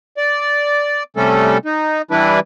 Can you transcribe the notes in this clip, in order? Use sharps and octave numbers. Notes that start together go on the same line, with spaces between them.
D5
C3 G3 A3 C#4 A4
D#4
E3 G3 D4 E4 B4